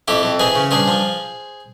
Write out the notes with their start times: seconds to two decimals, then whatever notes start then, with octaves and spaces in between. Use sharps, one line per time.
0.08 F2 E4 G4
0.23 F2
0.39 E3 G#4 C5
0.56 C#3
0.71 G2 G#4 C5
0.88 F3